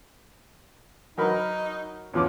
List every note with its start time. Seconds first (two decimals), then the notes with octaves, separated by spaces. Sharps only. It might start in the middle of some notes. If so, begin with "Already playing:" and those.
1.18 F#3 D#4 A#4 B5
2.14 E2 F3 C#4 D6